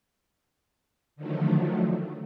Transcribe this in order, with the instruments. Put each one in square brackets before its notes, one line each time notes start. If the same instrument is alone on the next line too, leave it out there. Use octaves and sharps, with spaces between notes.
[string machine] D3 D#3 F3 F#3 A3